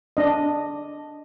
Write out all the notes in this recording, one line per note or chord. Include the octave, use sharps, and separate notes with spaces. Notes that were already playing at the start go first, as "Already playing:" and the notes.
D4 D#5